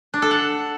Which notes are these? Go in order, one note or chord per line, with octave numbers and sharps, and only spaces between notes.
D4
A4
F#5